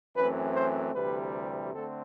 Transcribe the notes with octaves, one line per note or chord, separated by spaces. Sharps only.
F#2 E3 A3 C4 B4
C5
D2 C3 E3 G3 B4
D3 A3 C4 A4